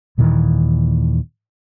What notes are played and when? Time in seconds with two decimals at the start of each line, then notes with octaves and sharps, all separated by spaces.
0.18 D#2 A#2 D#3 E3